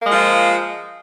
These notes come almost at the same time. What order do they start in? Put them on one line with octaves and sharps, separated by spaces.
A#3 G#3 F3 F4